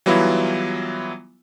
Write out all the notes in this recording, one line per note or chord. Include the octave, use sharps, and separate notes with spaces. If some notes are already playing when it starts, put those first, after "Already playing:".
E3 F#3 G3 B3 E4 F4